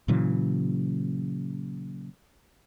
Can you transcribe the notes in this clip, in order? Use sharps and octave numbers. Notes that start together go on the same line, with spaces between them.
A#2 C#3 E3 F#3